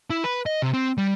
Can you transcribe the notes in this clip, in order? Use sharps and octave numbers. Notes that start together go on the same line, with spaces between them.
E4
B4
D#5
C3
C4
G3